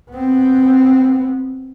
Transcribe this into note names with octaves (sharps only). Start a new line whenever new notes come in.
B3 C4